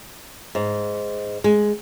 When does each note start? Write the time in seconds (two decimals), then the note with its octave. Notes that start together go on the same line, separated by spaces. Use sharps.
0.55 G#2
1.44 G#3